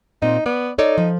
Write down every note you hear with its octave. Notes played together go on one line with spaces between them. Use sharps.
A#2 C4 D#4
B3 D5
D#4 A4 C#5 D5
F3